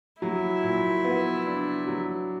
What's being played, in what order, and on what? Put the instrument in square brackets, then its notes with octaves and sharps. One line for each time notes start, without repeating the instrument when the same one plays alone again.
[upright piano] F#3 [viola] E4
[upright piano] A#2
B3
D4
F#3